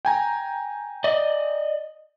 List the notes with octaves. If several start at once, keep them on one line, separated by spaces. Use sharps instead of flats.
G5 G#5 A#5
D5 D#5